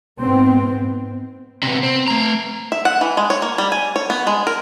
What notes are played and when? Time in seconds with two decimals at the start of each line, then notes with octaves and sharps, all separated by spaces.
0.22 G#2 B3 C4
1.63 C3 B3
1.83 C4
2.08 A3 A#5
2.72 E5
2.85 F#5
3.01 E3
3.17 G#3
3.30 C#5
3.42 A#3
3.58 G3
3.72 G#5
3.96 C#5
4.10 B3
4.27 G#3
4.47 A#4